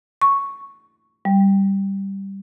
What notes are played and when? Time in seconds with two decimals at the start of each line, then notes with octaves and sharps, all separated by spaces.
0.22 C#6
1.25 G3